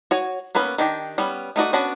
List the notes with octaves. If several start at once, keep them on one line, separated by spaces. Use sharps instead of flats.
F#4 C#5 G#5
A#3 B3 C#4 B4
D#3 D4 G4
G3 B3 C#4
A3 D#4 F#4 D5
B3 C#4 D4 F#4